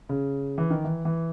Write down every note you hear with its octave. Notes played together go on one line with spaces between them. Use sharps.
C#3
E3
D#3
E3
E3